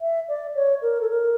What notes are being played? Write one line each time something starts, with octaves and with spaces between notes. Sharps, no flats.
E5
D5
C#5
A#4
A4
A#4